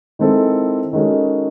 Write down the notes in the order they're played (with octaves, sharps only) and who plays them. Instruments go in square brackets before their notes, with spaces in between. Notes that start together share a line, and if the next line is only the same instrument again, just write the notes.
[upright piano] D#3 G#3 C4 E4 A4
D#3 G#3 C#4 F#4 A4